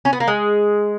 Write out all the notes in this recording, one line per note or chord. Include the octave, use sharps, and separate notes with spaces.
C#4
B3
A#3
G#3